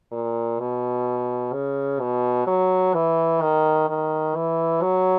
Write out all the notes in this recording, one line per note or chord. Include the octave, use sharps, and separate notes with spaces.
A#2
B2
C#3
B2
F#3
E3
D#3
D#3
E3
F#3